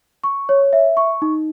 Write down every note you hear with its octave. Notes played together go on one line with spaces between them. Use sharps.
C#6
C#5
E5
C#6
D#4